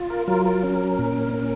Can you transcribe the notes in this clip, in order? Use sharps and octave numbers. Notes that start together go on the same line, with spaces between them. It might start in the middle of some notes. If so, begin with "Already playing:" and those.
Already playing: F4
A#4
F#3 A#4
A#4
C#4
A#2
C#4